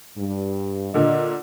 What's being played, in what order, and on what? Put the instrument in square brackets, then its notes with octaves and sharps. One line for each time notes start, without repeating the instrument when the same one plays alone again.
[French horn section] G2
[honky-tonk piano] A#2 D3 [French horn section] D#5